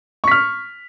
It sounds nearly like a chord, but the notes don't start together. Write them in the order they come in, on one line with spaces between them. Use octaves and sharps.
C#6 B6 F6